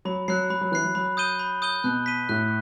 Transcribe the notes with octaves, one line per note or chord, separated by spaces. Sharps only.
F#3 B5
F#3 F#6 C7
F#3 B5
F#3
E3 F#6 C7
F#3
F#3 B5
D#6 G6 D#7 G7
B5
D#6 G6 D#7 G7
B2 F#6
B6 D#7 G7
A2 F#6